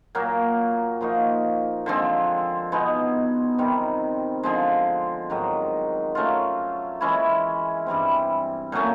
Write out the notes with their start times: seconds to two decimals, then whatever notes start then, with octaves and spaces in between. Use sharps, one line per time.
0.15 A#2 F#3 A#3
1.01 F3 A#3 D#4 F#4
1.86 D3 F3 G#3 C4
2.72 B2 G#3 B3 D#4
3.58 C3 D#3 G3 C4
4.43 D3 F3 G#3
5.30 G#2 D#3 F#3
6.15 F#3 A3 C#4 F4
7.01 E3 G#3 C#4 E4
7.86 G2 E3 G3 C4
8.72 A#2 F#3 A3 C#4